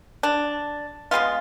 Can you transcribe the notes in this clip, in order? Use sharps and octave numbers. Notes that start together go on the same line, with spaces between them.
D4
C#3 G#3 B3 F4